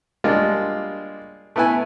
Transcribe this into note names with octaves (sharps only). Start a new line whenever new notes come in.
G3 G#3 A#3 D4 F4
A3 B3 E4 B4 G#5